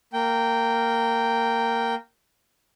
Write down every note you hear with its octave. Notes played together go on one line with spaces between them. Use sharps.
A#3 G5